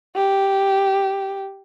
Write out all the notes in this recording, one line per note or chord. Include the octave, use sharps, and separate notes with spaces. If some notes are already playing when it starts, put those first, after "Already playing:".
G4